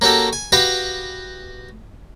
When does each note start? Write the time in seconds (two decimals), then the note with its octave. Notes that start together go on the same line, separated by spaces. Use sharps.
0.01 A#3 C#4 F#4 G4 A4
0.33 G#5
0.52 F#4 G4 B4 D#5 F5